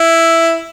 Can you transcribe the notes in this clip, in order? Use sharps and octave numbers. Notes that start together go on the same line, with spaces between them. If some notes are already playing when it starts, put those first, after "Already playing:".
Already playing: E4